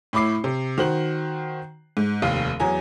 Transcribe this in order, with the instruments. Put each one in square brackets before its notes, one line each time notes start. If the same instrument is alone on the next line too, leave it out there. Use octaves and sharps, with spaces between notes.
[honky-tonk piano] A2 E4 B5 D6 C7
C3
D#3 F#4 C5 F#7
G#2
F1 D#2 F5
E2 F#3 G#5 A#5